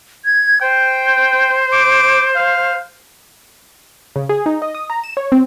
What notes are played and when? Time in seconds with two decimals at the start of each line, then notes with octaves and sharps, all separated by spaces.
0.25 G#6
0.61 C5 G5
1.73 D6
2.36 F5
4.16 C#3
4.29 G#4
4.46 D#4
4.62 D#5
4.75 D#6
4.90 A#5
5.04 E7
5.17 C#5
5.32 C4